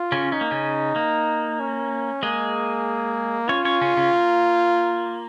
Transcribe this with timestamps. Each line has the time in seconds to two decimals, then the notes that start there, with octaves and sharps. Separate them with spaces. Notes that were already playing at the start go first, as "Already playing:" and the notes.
Already playing: F4
0.12 C#3 C#4
0.32 C#4 D#4
0.41 A#3
0.51 C#3 C#4
0.96 A#3
1.59 C#4
2.23 G#3 A#3 G#4
3.49 C#4 F4 C#5
3.65 C#4 C#5
3.81 C#3 C#4
3.97 C#3 C#4
4.13 A#3